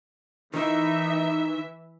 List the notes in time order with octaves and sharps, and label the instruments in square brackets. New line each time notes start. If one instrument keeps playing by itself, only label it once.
[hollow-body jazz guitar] D#3 [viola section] E3 E5 [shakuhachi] D#4